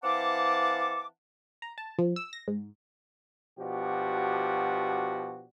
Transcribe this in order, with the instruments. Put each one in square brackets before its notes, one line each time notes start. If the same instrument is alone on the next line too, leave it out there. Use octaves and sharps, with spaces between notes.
[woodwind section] E3 C4 F5 F#5 A5 D6
[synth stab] A#5
A5
F3
E6
A#6
G#2
[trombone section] B2 F3 D4 F#4 G4